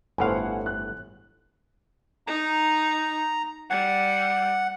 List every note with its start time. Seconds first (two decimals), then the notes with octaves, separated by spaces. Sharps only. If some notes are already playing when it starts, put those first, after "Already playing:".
0.18 G1 A2 C5 F5 F#5 G#5
0.66 F#6
2.27 D#4 A#5
3.70 G3 F#5